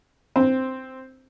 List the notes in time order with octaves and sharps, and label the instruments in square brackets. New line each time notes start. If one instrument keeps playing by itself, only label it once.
[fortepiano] C4